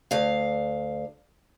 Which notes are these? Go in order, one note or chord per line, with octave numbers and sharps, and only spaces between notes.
D2 F5